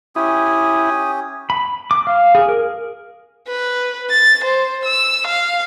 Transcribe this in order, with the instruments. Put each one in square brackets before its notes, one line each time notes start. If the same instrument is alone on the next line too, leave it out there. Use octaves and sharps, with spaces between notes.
[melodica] C#4 G4 G#5 [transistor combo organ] E4 [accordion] D#6
[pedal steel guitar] B5
D6
F5
G#4
A#4
[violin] B4
A6
C5
E6
F5